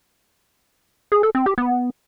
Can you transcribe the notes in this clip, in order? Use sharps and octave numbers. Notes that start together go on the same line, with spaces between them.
G#4
A4
C4
G4
B3